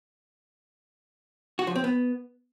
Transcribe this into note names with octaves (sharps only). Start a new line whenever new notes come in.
F#4
F3
C4
B3